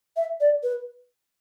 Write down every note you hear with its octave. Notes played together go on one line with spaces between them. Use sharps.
E5
D5
B4